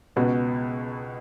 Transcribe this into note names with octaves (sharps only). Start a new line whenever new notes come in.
C#2 B2 B3 F#4